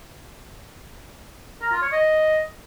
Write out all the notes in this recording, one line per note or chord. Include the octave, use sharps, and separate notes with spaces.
A#4
F4
C#5
D#5